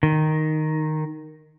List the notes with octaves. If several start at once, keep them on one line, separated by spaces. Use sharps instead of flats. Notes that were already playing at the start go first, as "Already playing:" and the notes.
D#3